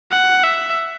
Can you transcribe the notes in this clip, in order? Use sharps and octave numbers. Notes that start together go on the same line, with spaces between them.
F#5
E5